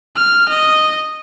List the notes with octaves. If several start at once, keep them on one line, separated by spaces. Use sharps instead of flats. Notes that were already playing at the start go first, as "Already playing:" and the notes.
F6
D#5